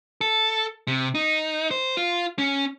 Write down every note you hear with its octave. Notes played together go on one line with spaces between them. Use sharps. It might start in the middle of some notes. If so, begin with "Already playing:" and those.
A4
C3
D#4
C5
F4
C#4